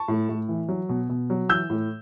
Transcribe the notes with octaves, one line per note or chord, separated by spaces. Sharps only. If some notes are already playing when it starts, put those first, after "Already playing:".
Already playing: A5 C#6
A2
A2
E3
F#3
B2
B2
F#3
E3 E6 G6
A2